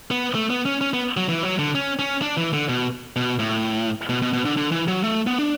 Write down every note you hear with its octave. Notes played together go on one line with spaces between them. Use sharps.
B3
A3
B3
C#4
C#4
B3
F#3
E3
F#3
D3
C#4
C#4
D4
E3
D3
B2
B2
A2
B2
B2
B2
D3
D3
E3
F#3
A3
B3
D4